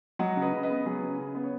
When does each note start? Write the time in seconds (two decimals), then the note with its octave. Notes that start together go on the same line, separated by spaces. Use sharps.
0.19 F#3 D#5 F#5
0.36 C#3
0.42 B4 D#5
0.53 C#3
0.63 B4 D#5
0.69 B3
0.86 F#3 G#4 B4
1.02 C#3
1.19 C#3
1.35 B3
1.43 C#5